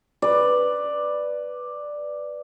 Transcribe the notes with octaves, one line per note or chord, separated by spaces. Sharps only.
B4 D5